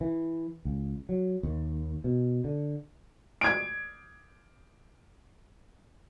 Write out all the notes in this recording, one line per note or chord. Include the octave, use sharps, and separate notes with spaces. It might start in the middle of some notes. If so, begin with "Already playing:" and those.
E3
C#2
F#3
D#2
B2
D3
G#6 D7